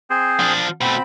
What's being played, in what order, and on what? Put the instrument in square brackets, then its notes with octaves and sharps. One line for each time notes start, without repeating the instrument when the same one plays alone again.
[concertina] C4 G#4 C5
[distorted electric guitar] F3 D4
[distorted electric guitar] B2 A3 [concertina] C4 B5